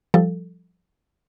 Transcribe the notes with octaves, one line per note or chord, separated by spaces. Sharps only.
F3 G3 A4